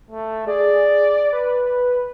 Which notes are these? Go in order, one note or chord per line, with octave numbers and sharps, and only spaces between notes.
A3
G#4 D5
B4